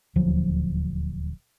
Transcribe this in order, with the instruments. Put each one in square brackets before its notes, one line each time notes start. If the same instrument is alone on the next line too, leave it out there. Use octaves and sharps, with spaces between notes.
[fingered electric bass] D#1 D2 F3 F#3